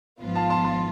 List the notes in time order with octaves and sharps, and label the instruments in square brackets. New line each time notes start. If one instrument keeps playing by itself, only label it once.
[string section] G#1 G#2 F3 B3 F4
[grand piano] F5 A5
A5 C6
A5 C6